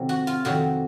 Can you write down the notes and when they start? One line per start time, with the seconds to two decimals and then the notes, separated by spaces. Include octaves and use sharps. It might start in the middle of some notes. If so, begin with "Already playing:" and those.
Already playing: F2 C3 D#3 F#3
0.09 F#4
0.27 F4
0.45 F2 C3 D#3 F#3 F#4